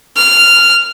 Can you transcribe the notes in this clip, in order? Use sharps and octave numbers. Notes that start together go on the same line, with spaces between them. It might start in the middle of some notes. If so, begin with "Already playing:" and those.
F6